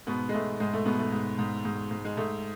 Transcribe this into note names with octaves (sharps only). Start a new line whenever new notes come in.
G#2 B2 B3
G#3
G#2 A3
G#2 G#3
A3
G#2 B2 B3
A3
G#2
G#2
G#2
G#2
G#3
G#2 A3